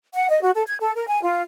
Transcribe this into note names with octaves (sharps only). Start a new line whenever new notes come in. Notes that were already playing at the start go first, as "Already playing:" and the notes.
F#5
D#5
F#4
A4
G#6
A4
A#4
G#5
F4